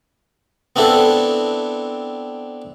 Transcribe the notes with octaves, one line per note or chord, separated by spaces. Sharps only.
B3 C4 D4 E4 A4